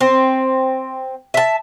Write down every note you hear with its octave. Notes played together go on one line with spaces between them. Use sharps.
C4
E5 A5